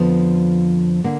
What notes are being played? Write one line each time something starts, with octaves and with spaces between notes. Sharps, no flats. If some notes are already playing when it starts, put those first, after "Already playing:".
Already playing: F2 D3 F3 B3
D3 A#3